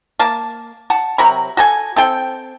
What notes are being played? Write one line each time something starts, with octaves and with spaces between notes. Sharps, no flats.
A#3 A5
F#5 A5
C3 F#3 A#4 B5
F#4 A4 G#5
C4 A4 G5